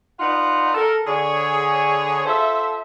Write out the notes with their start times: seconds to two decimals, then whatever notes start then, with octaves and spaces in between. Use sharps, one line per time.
0.20 D4 D#4 F4 B4 D#5 F#5
0.75 A4 A#4
1.07 D3 G#4 C#5
2.26 F4 A4 C5 E5